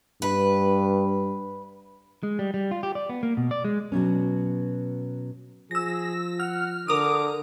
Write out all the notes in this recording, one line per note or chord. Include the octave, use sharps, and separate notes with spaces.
G2 B4
G#3
G3
G3
F4
G4
D5
B3
A#3
B2
D5
G#3
B2 F#3 B3 C#4
F3 G#4 E6 A#6
F#5 F6
D3 A#4 D6 D#6